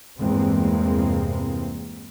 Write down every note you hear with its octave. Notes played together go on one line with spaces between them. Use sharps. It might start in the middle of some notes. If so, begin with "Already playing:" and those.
E2 G2 C3 G#3 A#3 C4